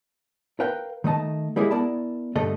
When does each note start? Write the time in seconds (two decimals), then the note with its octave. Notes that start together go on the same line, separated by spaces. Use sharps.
0.60 A#4 B4 F5 G5
1.04 D#3 A3 D#5 A5
1.56 G3 G#3 A#3 E4 G4 G#4
1.70 B3 E4 A#4 D5 A5 B5
2.36 G2 D3 A3 A4 D#5